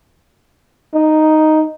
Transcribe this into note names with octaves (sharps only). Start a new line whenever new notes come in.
D#4